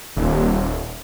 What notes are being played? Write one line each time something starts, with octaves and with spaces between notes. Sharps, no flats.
D#1